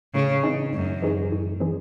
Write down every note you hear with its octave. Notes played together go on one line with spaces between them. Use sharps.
A2 C#3
E3 C4 D#4 G#4
F#2 A2
E3 C4 D#4 G#4
A2
E3 C4 D#4 G#4